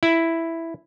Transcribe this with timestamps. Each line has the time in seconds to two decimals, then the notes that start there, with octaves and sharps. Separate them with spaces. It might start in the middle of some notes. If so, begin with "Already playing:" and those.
0.03 E4